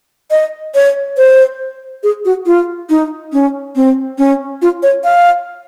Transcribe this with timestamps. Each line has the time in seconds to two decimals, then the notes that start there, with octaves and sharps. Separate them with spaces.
0.31 D#5
0.75 C#5
1.17 C5
2.03 G#4
2.25 F#4
2.46 F4
2.90 D#4
3.33 C#4
3.76 C4
4.18 C#4
4.62 F4
4.83 C#5
5.04 F5